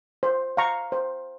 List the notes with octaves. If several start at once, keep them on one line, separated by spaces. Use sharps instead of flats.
C5
F5 A#5 C#6
C5